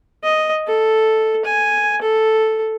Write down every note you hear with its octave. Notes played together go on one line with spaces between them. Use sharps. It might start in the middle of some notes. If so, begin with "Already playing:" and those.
D#5
A4
G#5
A4